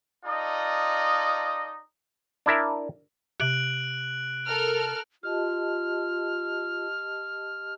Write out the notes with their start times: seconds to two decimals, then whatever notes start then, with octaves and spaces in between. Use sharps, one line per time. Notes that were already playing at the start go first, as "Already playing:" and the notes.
0.25 D#4 F4 A4 D5 D#5
2.46 D4 E4 A#4 E5
3.40 C3 F#6 D7 F#7
4.46 A4 A#4 F6
5.23 F4 G4 D#5 A5 F6